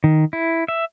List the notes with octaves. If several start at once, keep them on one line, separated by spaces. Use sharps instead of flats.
D#3
E4
E5